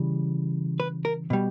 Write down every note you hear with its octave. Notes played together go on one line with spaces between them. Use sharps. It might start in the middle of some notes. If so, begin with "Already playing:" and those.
Already playing: C#3 E3 G3
B4
A#4
B2 G3